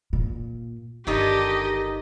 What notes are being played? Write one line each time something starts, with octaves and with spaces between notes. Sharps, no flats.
A#2
G1 D3 D#3 D#4 G4 D#5